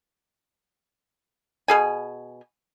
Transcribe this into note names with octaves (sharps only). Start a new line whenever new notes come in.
B2 G#4 G#5